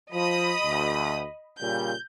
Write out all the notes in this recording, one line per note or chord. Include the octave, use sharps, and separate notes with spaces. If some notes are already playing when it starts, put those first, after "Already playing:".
F3 D#5 B5 D#6
D2
A#2 C#3 G3 G6